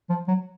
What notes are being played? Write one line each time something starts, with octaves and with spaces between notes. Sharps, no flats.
F3
F#3